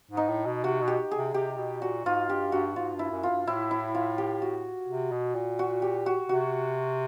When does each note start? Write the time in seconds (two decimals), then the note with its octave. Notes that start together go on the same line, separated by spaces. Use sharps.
0.11 G#2
0.17 D#4
0.28 A2
0.46 B2
0.63 C3 F#4
0.82 B2
0.88 G4
1.11 G#4
1.17 C3
1.34 C3 G4
1.58 B2
1.82 A#2 F#4
2.05 G#2 F4
2.29 G2 G4
2.52 G2 F#4
2.76 G#2 F4
2.94 G2
2.99 E4
3.11 F#2
3.23 F4
3.29 G2
3.46 A2 E4
3.71 E4
3.95 F4
4.18 G4
4.42 F#4
4.88 C3
5.12 B2
5.35 A#2
5.59 F#4
5.82 G4
6.06 F#4
6.29 C3 F#4